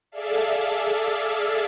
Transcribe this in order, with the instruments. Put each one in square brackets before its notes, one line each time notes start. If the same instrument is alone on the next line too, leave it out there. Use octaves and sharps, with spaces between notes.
[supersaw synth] G#4 A4 D5 E5 F5